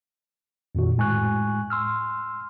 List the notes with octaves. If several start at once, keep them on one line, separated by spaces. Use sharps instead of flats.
F2 A#2 D#3 F#4
A2 G#3 G#5 C#6 F#6
C6 E6 F6